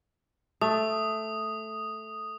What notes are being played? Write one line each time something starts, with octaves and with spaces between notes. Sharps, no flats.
A3 D#6